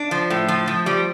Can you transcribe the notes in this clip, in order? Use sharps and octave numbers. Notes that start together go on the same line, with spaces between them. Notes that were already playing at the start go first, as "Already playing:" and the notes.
Already playing: D4
F3
A2
F3
F3
G3